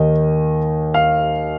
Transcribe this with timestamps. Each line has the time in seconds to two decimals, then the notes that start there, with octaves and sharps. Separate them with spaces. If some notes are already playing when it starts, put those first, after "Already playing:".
Already playing: D#2 D#3 D#5
0.94 F5